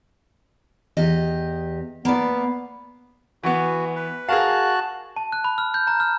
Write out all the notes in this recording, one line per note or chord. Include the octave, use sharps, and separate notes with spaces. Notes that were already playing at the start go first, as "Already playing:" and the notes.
E2 G4 D#5
A#3 B3 D5
E3 B3 F#4
B4
F#4 G#4 A#4 F5 A5 F#6
A5
F#6
B5
F6
G6
A#5
F6